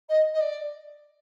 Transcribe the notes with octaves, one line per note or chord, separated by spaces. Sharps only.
D#5
D#5
D5